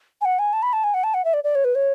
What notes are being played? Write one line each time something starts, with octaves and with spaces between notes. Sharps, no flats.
G#5
F#5
G#5
A5
B5
A5
G#5
F#5
A5
F#5
E5
D5
D5
C#5
B4
C#5